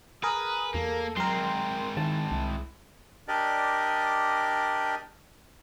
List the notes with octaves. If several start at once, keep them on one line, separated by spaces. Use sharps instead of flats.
G#4 A#4 B4 D#6
E2 A#3 A4
F#3 G#3 C4 A#4 G5 C6
D#3 E4 A5
C2 E4
D4 G4 A#4 D5 D#5